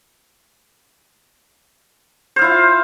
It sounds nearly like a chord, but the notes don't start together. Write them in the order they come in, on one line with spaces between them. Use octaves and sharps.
C5 F5 E4 F4